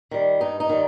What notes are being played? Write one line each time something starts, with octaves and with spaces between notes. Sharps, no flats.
D#3 G3
G2 D#4
D#4
D#3 G3